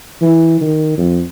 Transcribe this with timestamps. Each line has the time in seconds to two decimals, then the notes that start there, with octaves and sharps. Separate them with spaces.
0.21 E3
0.61 D#3
0.97 F2